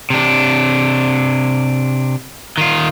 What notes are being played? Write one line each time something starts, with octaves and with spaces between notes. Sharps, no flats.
C3 D4
D#3 F4